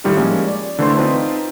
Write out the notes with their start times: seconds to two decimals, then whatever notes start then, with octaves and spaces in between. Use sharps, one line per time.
0.04 A2 D#3 G3 D#4 F4 G4
0.17 F3 G3 G#3 A#3 C#4
0.48 D5
0.79 D3 E3 A3 D4 C5 C6
0.97 C4 D#4 F4 B4 C5 A5